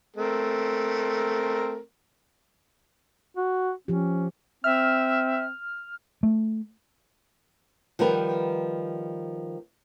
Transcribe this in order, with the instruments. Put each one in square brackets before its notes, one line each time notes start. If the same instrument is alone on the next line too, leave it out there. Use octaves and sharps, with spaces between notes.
[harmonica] A3 C4 A#4
[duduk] F#4
[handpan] F3 G4 [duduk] C#4
[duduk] C4 [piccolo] E5 [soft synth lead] F6
[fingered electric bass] A3
[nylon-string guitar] D#3 F3 G3 B3 A#4